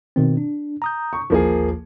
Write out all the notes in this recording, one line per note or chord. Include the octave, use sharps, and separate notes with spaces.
B2 D#3 C4
D4
A#5 D#6 G6
C#6
A1 D#2 F3 A#3 G#4